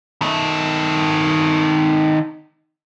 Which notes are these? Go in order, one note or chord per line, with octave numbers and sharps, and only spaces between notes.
D#3 A4